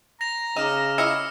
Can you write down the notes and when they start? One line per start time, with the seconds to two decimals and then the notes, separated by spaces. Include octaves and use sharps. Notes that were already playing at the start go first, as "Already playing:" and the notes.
0.21 A#5 A#6 F7
0.56 C#3 D#4 D6 F6 E7
0.98 E4 D#5 F5 E6 C#7